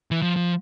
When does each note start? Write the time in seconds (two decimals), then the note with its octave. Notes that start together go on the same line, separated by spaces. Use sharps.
0.11 E3
0.22 F3
0.36 F3